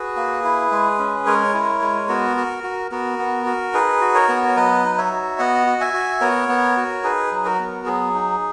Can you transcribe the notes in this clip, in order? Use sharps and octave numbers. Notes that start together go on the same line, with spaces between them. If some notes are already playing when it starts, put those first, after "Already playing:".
Already playing: F#4 G#4 B4
A#3
E4
G#3
C#4
G#3 A#4 C#5
E4
G#3
B3 F#4 A#4
F#4
F#4
B3 F#4 A#4
B3
F#4
D#4 G#4 B4
F#4
A#4 C#5
B3
C#5
F#3 B4 D#5
D#4
C#5 E5
F#4
B3 D#5 F#5
F#4
E5 G#5
F#4
B3 A#4 C#5
B3
F#4
D#4 G#4 B4
F#3
F#4 A#4
B3
F#3 G#4
D#4